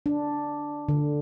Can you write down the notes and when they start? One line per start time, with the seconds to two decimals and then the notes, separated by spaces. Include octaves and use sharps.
0.06 D4
0.88 D3